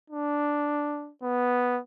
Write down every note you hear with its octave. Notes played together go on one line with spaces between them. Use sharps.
D4
B3